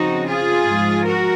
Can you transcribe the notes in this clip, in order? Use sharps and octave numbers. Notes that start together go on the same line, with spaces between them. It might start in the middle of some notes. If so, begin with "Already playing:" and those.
Already playing: C#3 F3 C4 D#4 F#4
F4 G#4
G#2 F3 G#3
F#4 A#4